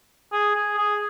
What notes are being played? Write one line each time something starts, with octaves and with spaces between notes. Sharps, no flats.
G#4
G#4
G#4